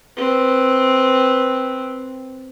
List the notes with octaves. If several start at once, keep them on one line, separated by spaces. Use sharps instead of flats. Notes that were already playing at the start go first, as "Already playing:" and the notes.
C4 B4